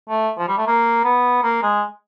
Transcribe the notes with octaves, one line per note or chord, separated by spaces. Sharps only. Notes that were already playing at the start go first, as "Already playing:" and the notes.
A3
F3
G3
A3
A#3
B3
A#3
G#3